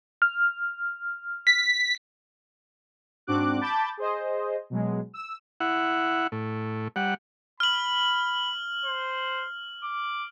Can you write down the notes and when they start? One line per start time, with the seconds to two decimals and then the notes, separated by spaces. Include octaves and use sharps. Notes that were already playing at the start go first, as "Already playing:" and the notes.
0.22 F6
1.47 B6
3.27 G#2 C4 D4 F#4 D6 F#6
3.61 A5 B5 D6 G6 A6
3.97 G#4 C5 D#5
4.70 B2 F#3 G#3
5.14 E6
5.60 E4 F#5
6.32 A2
6.96 G3 F#5
7.60 B5 F6 F#7
8.86 C5
9.84 D6